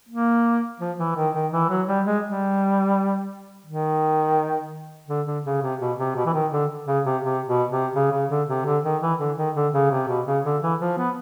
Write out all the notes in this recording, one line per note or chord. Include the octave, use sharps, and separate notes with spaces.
A#3
F3
E3
D#3
D#3
E3
F#3
G3
G#3
G3
D#3
D3
D3
C#3
C3
B2
C3
B2
E3
D#3
D3
C#3
C3
C3
B2
C3
C#3
C#3
D3
C3
D3
D#3
E3
D3
D#3
D3
C#3
C3
B2
C#3
D3
E3
F3
B3